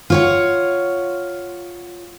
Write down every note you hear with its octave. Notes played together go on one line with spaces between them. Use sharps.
F4 C#5 F#5